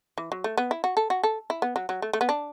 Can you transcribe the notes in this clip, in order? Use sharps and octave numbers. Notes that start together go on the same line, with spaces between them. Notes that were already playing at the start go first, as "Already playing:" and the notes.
E3
F#3
A3
B3
E4
F#4
A4
F#4
A4
E4
B3
F#3
F#3
A3
A3
B3
D4